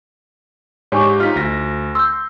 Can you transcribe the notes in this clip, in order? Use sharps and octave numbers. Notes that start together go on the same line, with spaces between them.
G#2 D4 G4 C#5 G#5 C#6
D#4 F4 F6 B6
D2 A#6
C6 E6 G6